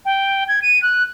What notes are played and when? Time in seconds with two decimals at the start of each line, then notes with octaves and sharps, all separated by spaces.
0.05 G5
0.48 G#6
0.62 D#7
0.82 F#6